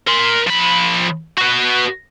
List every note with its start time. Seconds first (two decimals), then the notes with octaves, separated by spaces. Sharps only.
0.07 A#4 C6
0.47 F3 B5
1.38 F#4 B4